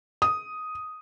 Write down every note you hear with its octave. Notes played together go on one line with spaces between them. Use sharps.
D#6